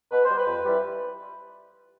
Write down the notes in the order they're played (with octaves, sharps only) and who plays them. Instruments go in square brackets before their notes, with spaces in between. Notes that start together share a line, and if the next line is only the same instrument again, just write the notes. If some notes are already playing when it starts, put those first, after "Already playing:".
[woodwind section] B2 B4
C5
G3
B4
F2
E3 G3